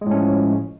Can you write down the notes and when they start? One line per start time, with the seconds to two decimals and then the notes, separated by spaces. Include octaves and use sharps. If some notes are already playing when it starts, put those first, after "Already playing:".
0.01 G#3
0.06 A2
0.11 C#4
0.16 F3